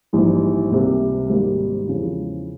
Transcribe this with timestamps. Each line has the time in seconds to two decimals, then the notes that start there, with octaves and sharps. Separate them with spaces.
0.13 A#1 G#2 E3 G3
0.71 C#2 C3 G3 A#3
1.29 G#1 G#2 G3 A#3
1.88 E2 C#3 F3